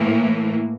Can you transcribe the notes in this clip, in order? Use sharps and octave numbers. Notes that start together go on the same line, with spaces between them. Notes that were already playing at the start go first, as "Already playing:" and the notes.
Already playing: A2 E3 A#3